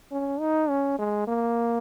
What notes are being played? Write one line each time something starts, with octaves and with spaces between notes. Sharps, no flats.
C#4
D#4
C#4
G#3
A#3